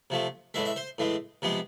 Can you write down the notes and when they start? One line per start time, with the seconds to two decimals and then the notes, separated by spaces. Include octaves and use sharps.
0.10 C3 F3 A3
0.54 A2 E3 G#3 E5
0.65 E5
0.76 C5
0.98 A2 E3 G#3
1.42 C3 F3 G#3 B3